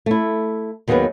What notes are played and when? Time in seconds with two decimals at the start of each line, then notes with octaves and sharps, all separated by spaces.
0.06 A3 E4
0.88 D#2 D#3 F#3 B3 G#4 B4